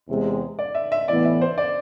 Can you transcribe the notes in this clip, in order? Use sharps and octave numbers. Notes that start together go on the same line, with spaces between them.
E2 C3 G#3
D5
E5
E5
A2 E3 B3 D5
E5
C5
D5